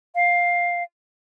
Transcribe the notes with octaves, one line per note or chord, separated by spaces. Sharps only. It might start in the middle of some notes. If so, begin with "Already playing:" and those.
F5